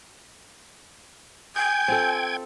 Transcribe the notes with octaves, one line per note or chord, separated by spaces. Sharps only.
G5 G#5 G6 G#6
C4 F4 A4